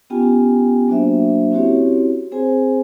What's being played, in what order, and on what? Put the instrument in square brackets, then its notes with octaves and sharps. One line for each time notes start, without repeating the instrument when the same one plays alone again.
[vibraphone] B3 C#4 F4 G4 G5 G#5
F#3 A#3 D4 F#4 C5 E5
C4 C#4 E4 F#4 G4 C#5
C4 G#4 C5 G#5